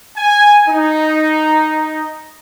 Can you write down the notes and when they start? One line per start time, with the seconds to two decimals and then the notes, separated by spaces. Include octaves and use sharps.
0.17 G#5
0.68 D#4